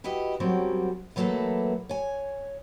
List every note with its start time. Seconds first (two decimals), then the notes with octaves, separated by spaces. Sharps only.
0.04 E4 F#4 G4 B4 D#5
0.40 F#3 G3 C4 C#4 F#4 A#4
1.16 E3 F#3 A3 A#3 A4 B4
1.89 C#5 G#5